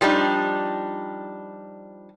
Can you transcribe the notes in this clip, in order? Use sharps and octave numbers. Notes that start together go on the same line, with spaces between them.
F3 G3 D4 D#4